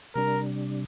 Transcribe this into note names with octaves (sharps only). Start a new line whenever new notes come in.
C3 G3 D4 A#4